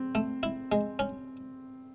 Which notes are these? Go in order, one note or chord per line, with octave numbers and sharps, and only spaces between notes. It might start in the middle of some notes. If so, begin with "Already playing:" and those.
Already playing: C4
A3
E4
G#3
C#4